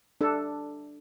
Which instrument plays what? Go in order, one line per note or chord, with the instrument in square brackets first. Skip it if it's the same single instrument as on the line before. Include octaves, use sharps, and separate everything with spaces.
[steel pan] D4 A4